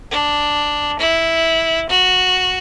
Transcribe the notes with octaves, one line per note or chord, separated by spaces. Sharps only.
D4
E4
F#4